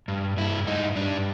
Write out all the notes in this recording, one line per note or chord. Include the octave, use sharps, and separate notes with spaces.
G2
G2 E4
G2 D#4
G2 D4